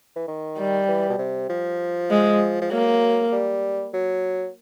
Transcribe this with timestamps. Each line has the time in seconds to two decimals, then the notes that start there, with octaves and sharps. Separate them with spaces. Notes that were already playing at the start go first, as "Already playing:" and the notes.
0.16 E3
0.28 D#3
0.57 G3
0.88 E3
1.10 B2
1.19 C3
1.49 F3
2.10 G#3
2.61 F3
2.72 F#3 A#3
3.32 G3
3.94 F#3